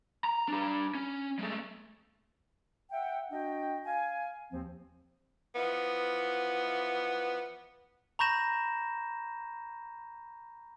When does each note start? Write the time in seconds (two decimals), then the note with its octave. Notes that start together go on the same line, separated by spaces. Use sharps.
0.24 A#5
0.48 D4 G4
0.95 C#4
1.39 G#3 A3
2.92 E5 F#5 G5
3.32 D4 F#4 D#5 G5
3.86 F5 G#5
4.52 D#2 F3 C4
5.54 E3 F3 B3
8.19 A#5 B5 C#6 G6 A#6 E7